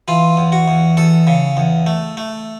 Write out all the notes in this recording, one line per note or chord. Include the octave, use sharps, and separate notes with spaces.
E3 F4
E2
F#4
E2
E2 A4
C#3
E2
A3
A3